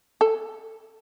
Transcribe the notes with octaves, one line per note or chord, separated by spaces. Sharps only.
A4